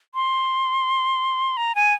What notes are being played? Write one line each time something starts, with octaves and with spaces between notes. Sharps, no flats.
C6
A#5
G#5